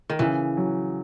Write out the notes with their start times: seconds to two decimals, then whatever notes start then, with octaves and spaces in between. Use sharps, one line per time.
0.10 D#3
0.19 C#3 E3
0.57 F#3